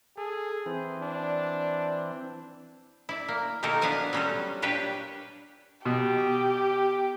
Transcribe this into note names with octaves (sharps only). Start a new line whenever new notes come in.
G#4 A4
E3 C4
D4
E4 D5
A#3
B2 D#3 A#3 D#4 A4 A#4
B3 D4 F5 F#5 G#5 A5
F#3 G3 C#4 F4 F#4 A4
A#2 D4 G4 B4 C#5 G5
B2 G4